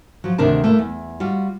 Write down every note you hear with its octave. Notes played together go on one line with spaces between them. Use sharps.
F3 F#3
D2 C3 D#3 D4 A#4 A5
A3 A#3 E4
E2
G3 F4 F#4